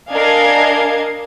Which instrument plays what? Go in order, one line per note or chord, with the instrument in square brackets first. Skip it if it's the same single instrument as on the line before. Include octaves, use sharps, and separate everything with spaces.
[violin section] D4 A#4 D#5 F5 G#5 G#6